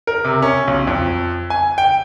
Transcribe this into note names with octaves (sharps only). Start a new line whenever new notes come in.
A#4
C3
C#4
B1
F2
G#5
G5